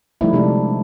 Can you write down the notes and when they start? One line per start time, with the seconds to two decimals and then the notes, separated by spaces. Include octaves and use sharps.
0.21 D3 F3 G3 A3 D#4 E4
0.33 C3 G#3 A3 D4